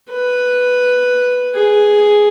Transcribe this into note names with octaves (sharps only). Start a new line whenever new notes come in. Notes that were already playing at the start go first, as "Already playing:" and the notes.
B4
G#4